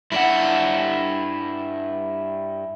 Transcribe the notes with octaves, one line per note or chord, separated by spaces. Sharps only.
G2 D4 E4 F#5